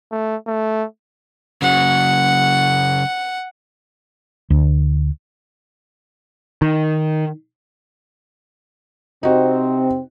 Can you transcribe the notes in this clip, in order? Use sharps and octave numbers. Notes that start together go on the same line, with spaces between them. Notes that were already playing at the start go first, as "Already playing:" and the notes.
A3
A3
C#3 F#3 F#5
D2
D#3
C3 C4 D#4 F#4